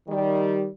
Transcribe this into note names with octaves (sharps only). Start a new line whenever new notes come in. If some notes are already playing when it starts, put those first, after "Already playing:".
D#3 G3